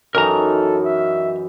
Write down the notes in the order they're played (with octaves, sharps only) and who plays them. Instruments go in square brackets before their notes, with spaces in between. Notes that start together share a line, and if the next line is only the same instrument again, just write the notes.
[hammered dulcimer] F#2 E3 D#4 [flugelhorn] A4 [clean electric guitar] A#4 A#5
[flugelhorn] E5